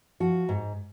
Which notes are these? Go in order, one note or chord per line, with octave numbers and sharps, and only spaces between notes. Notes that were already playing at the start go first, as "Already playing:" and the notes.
F3 F#4
G#2